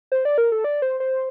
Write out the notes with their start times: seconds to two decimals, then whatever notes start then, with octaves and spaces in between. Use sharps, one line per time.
0.12 C5
0.25 D5
0.38 A#4
0.52 A4
0.64 D5
0.82 C5
1.00 C5